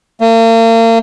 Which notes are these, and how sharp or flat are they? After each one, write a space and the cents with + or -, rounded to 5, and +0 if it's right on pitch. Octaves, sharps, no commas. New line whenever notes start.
A#3 -40